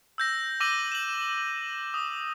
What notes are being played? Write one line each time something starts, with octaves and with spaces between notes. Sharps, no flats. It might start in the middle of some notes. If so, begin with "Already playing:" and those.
E6 G6 A#6
D6 E6 A#6 D#7 F#7 G7
E7 F#7
D#6